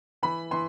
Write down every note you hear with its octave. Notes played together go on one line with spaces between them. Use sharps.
E3 B5
E3 C6